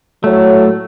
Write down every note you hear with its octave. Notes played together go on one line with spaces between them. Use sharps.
A2 F#3 A3 C#5